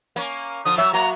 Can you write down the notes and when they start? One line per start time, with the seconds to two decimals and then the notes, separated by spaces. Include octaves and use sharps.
0.16 A#3 C#4
0.65 D3 F3 D#6
0.78 F#3 C#5 E5 E6
0.93 F#3 A#3 F#4 A#5